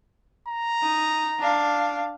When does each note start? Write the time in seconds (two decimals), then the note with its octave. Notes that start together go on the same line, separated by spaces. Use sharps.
0.48 A#5
0.82 D#4
1.39 D4 F5